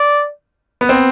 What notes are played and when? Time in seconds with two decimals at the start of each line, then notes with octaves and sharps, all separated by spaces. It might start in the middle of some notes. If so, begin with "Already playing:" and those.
Already playing: D5
0.81 B3
0.89 C4